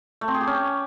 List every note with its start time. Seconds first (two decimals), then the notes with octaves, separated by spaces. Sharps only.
0.21 A3
0.28 C4
0.34 G#4
0.41 G4
0.47 C#4